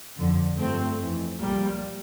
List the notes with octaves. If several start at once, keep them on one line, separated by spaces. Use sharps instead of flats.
F2 D3 F3
G2 F3 A3 C4
F2 E3
C2 A#2 F3 G3 A#3